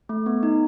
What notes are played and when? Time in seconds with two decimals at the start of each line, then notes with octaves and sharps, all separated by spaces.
0.09 A3
0.26 B3
0.43 D#4